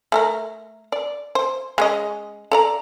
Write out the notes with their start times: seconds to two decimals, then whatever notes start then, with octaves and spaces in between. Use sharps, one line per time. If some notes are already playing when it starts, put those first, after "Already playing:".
0.12 A3 A4 A#4
0.92 D5
1.35 C5
1.78 G#3 C#4 D#5
2.52 A4 D5 A#5